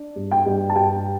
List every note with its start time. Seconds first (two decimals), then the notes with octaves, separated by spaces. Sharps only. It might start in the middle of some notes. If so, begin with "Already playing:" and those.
Already playing: D4
0.16 G2
0.31 G5
0.46 G2
0.69 A5
0.75 G2 G5